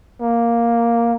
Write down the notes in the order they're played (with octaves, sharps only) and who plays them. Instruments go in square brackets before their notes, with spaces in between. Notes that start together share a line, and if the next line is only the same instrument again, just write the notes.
[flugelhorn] A#3